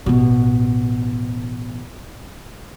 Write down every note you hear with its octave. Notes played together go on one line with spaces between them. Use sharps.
A1 B2